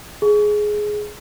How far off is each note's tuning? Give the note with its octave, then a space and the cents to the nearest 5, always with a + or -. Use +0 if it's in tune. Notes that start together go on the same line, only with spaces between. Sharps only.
G#4 +10